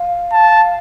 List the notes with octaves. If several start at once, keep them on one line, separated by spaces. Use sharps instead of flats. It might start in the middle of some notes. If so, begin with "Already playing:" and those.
Already playing: F5
A5